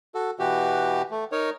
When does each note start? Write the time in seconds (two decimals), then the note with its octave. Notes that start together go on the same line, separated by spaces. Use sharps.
0.15 F#4 A4
0.39 B2 E3 F#4 G4
1.11 A3
1.32 D#4 A#4 C#5